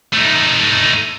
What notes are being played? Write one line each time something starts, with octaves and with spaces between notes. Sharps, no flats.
A3 D#4